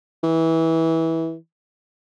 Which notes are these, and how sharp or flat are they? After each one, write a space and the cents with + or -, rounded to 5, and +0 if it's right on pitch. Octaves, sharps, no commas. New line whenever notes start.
E3 -20